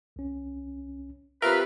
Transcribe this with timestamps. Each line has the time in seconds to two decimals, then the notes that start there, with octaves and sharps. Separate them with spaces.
0.16 C2 C#4
1.42 C4 F4 G4 A#4 B4 E5